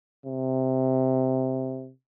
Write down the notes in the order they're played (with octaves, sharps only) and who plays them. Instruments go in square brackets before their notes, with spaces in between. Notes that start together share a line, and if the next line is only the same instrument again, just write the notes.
[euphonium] C3